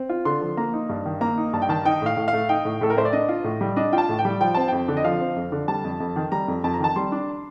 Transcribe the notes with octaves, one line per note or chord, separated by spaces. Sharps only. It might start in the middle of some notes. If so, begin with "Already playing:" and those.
Already playing: C4
F4
D3 C6
F3
A#3 A#5
D#4
G2
D#3
A#3 A#5
D#4
G2 A5
G5
D#3 A5
D#4 G5
A2 F5
A2
F5
A3
D#4 G5
A2
A2 A4
A#4
A3 C5
D5
D4 D#5
F4
A2
G3
D4 D#5
F4 G5
A5
A2
G5
G3
F3 G5
C4 A5
F2 G5
D3
D#5
F3 F5
C4
F2
D3
G3 A5
F2
F2
D#3
G3 A#5
F2
F2 A5
A#5
D#3 A5
G3 C6
D4